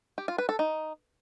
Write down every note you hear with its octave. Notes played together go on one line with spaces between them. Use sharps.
G4
F4
B4
A4
D#4